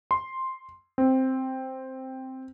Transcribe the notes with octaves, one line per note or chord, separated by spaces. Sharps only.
C6
C4